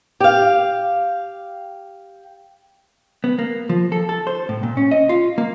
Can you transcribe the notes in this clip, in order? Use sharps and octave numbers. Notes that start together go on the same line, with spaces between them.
G4 F5
B3
A#3
F3
A4
A4
C5
A2
A#2
C#4
D#5
F4
A#3